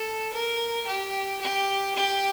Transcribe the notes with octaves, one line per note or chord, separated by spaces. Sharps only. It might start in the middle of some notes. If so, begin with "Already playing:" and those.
Already playing: A4
A#4
G4
G4
G4